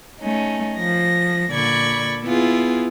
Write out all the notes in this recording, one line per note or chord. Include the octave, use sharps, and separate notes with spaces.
A3 C#4 D#4
F3 A#6
A#2 D3 D5 B5 C#6 G#6
B3 E4 F4 G#4